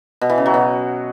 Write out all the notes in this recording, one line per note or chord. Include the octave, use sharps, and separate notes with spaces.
B2
E3
C#3
F#3
B2